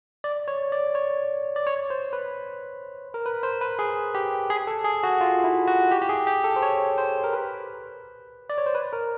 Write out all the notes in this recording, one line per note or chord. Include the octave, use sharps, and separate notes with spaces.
D5
C#5
D5
C#5
D5
C#5
C5
B4
A#4
B4
C5
B4
G#4
G4
G#4
A4
G#4
F#4
F4
E4
F#4
G4
G4
G#4
G4
A4
C5
C#5
C5
A#4
B4
D5
C#5
C5
B4
A#4